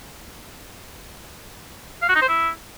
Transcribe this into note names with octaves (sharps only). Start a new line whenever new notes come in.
F5
F#4
D#4
C5
E4